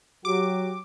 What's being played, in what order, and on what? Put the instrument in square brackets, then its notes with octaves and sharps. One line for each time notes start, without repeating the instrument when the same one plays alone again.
[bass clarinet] F#3 [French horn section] F#4 G4 [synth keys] D6